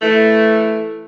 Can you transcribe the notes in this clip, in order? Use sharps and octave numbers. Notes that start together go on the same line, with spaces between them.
E3 A3